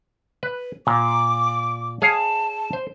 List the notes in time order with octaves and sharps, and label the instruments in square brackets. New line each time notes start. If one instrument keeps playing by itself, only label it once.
[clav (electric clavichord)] B4
[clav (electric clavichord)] A#2 [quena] D6
[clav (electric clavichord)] G#4 C#5 F5 [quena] A5
[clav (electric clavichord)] C5